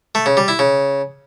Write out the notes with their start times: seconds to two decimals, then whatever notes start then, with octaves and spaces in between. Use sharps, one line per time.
0.15 A3
0.26 C#3
0.37 G3
0.48 E4
0.59 C#3